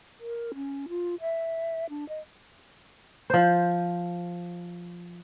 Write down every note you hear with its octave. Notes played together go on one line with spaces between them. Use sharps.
A#4
C#4
F4
E5
D4
D#5
F3 C5